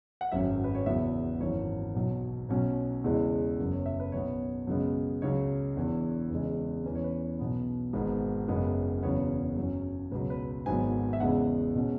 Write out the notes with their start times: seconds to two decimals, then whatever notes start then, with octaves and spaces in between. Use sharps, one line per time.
0.21 F#5
0.32 G#1 F#2 F#3 C#4 E5
0.64 B4
0.75 C#5
0.86 E2 C#3 F#3 B3 E5
1.40 G#1 F#2 E3 C#5
1.95 B1 B2 F#3
2.49 B1 B2 F#3 C#4
3.04 E2 C#3 E3 G#3
3.59 F#1 F#2 F#3 B3
3.72 C#5
3.86 E5
4.00 B4
4.12 B1 B2 B3 C#5
4.67 F#2 C#3 G#3 B3
5.22 C#2 C#3 F#3 C#5
5.76 E1 E2 E3
6.30 E2 C#3 G#3
6.84 E2 E3 C#4 B4
6.95 C#5
7.04 B4
7.39 B1 B2 B3
7.93 G#1 G#2 G#3 B3
8.48 F#1 F#2 C#3 G#3 B3
9.03 E1 E2 C#3 F#3 B3 C#5
9.57 F#2 F#3 C#4
10.11 C#2 B2 F#3 B4
10.30 B4
10.66 G#1 G#2 F#3 B3 G#5
11.13 E5
11.20 E2 C#3 G#3 B3 F#5
11.75 B2 G#3 C#4